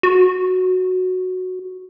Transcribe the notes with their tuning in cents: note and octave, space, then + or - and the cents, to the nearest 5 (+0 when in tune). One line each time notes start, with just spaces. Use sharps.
F#4 -5